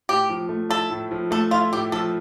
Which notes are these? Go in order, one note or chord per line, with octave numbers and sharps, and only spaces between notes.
A2 G4
F3
A3
E4 A4
A2
F3
A3 A4
E4 F4
A2 G4
F3 A4